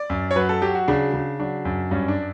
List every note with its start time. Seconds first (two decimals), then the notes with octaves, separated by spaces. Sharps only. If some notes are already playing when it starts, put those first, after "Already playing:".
Already playing: D5
0.10 F#2
0.31 C#5
0.36 F#3 B4
0.49 A4
0.61 F#3 G4
0.75 F#4
0.88 C#3 D4
1.13 C#3
1.39 F#3 D4
1.65 F#2
1.91 G2 C#4
2.08 D4